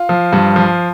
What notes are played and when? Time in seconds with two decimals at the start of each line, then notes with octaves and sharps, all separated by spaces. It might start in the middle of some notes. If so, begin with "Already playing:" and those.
Already playing: F4
0.09 F3
0.33 G2
0.56 F3